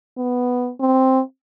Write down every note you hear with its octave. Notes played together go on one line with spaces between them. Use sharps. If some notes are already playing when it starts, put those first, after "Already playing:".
B3
C4